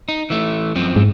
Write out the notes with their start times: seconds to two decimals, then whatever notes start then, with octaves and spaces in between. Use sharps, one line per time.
0.09 D#4
0.30 E3 A3
0.75 F#2 F3 C4
0.96 G#2